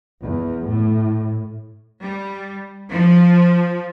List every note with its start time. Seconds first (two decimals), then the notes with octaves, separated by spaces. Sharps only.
0.21 E2
0.67 A2
2.02 G3
2.90 F3